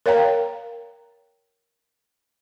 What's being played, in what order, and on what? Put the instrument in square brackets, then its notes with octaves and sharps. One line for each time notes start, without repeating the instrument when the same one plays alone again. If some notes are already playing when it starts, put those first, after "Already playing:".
[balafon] A#4 C#5 F5 G5 A#5